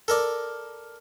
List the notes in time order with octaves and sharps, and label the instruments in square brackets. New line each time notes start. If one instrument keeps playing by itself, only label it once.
[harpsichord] A4 A#4 D5